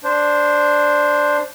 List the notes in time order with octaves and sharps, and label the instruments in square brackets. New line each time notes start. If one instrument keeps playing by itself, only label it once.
[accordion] D4 C5